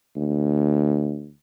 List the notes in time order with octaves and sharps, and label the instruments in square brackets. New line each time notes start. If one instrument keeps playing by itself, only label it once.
[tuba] D2